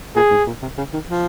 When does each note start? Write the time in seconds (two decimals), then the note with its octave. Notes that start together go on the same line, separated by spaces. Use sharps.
0.15 A#2 G#4
0.30 G#2
0.47 A#2
0.62 C3
0.78 C#3
0.93 D#3
1.09 F3